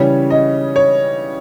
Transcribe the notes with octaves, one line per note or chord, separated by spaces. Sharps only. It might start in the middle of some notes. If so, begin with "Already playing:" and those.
Already playing: C#3 E3 G3 C#4 C#5
D#5
C#5